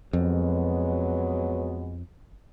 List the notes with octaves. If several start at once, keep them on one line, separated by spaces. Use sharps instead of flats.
F2 F#3 G#3 B3